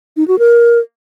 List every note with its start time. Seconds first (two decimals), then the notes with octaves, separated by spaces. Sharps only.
0.17 D#4
0.28 F#4
0.39 A#4